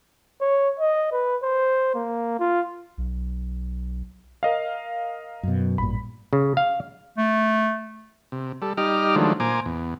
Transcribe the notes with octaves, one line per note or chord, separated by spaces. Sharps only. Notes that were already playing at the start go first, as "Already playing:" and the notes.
C#5
D#5
B4
C5
A#3
F4
B1
A#4 D#5 F5
F#2 B2
A1 G2 A#2 B5
C#3
F5
A3
C3
G3 A4
G3 D#4 G4 D#5 D6 F6
D#3 F3 F#3 G#3 A3 D4
A#2 C5 G#5 A#5 D6
E2